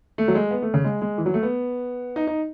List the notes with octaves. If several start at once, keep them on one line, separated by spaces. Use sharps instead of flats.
A3
F#3
G#3
B3
A3
C#3
G#3
G#3
E3
F#3
A3
B3
D#4
D#4